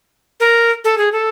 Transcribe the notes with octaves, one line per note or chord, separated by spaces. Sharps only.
A#4
A4
G#4
A4